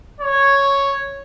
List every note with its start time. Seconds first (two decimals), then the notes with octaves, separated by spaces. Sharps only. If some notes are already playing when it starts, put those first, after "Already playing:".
0.20 C#5